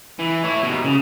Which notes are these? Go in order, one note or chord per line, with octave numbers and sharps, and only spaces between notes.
E3
E4 C#5
D#2 B2
C#3